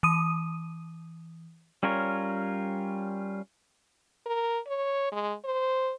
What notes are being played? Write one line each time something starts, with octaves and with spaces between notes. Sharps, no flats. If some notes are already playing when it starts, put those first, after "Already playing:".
E3 D#6 D#7
G3 C#4 F4 A#4 C#5
A#4
C#5
G#3
C5